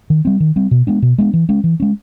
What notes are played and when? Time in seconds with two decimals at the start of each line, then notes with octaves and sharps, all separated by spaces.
0.10 D#3
0.25 G3 C4
0.40 D#3
0.56 G3 C4
0.71 B2
0.87 G#3 B3 D4
1.02 B2
1.18 G#3 B3 D4
1.34 E3
1.49 G#3 C#4
1.64 E3
1.80 G#3 C#4